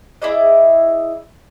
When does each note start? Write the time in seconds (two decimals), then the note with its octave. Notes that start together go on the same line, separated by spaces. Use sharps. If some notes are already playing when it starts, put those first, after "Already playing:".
0.22 E4 G#4 D5 D#5